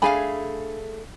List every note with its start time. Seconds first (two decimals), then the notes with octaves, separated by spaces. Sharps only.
0.02 A3 D4 G#4 F5 G#5 B5